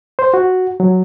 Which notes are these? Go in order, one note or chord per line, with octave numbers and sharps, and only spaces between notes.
C5
F#4
F#3